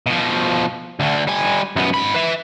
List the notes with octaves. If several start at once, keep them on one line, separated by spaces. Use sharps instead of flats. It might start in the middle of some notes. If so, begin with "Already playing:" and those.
B2 F3
D2 D3
G3 G#5
F#2 B3
G#2 B5
B4 E5